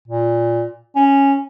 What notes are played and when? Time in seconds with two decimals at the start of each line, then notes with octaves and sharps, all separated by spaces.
0.08 A#2
0.96 C#4